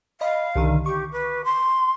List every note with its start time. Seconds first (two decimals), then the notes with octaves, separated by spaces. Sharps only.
0.21 D#5 F5 B5
0.55 C2 D3 D#3
0.86 G4 C#6 D6
1.12 B4
1.45 C6